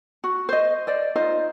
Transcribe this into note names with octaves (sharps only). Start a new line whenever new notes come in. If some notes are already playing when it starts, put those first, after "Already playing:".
F#4
C5 D#5
C5 D5 D#5
D#4 F4 C5 D#5